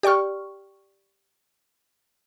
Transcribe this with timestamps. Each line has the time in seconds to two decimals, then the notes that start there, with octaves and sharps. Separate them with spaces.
0.03 G4 D5 G5 C#6 F6